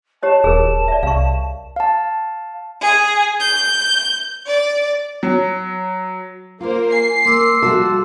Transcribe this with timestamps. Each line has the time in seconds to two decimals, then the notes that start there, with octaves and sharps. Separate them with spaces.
0.23 G4 C#5 D#5 A5
0.44 D#1 G#4 A#4
0.88 D5 E5
1.03 C2 F5 C#6
1.76 F5 A5
2.82 G#4
3.40 G6
4.47 D5
5.23 F#3
6.61 A#3 F4 A#4 C5
6.92 G#5 C7
7.25 A#3 A#4 C6 D6 E6
7.62 F3 G3 F#4 A4 F5